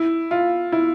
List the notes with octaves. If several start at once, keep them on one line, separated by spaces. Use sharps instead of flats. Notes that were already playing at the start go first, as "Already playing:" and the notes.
Already playing: E4
F4
E4